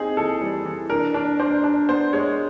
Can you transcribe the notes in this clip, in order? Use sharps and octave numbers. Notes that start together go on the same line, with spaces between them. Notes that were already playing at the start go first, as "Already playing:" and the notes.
Already playing: C4 D#4 G#4
E3 A4
G3
E3
D4 A#4
D4
D4 C5
D4
B3 C5
G#3 C#5